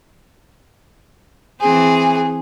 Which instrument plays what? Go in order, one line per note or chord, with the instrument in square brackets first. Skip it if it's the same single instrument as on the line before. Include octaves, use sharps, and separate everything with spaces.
[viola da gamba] E3 C4 [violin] G#4